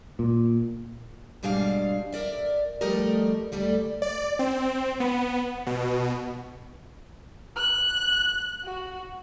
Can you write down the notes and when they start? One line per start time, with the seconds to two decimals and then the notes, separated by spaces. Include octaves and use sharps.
0.19 A#2
1.43 G#2 B2 G3 G#3 D4 F5
2.13 A#4 D5 E5
2.81 F3 G3 A3 G4 A#4 D#5
3.52 D2 G3 A3 A4 D5
4.02 D5
4.39 C4
5.00 B3
5.67 B2
7.56 F#6
8.64 F#4